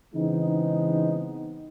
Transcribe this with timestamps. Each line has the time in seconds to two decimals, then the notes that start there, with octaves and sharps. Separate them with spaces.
0.14 C#3 E3 G#3 B3 C4 D#4